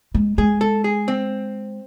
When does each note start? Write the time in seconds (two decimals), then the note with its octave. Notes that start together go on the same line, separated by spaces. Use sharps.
0.14 G#3
0.38 G#3 G#4
0.61 A4
0.84 G#4
1.08 C4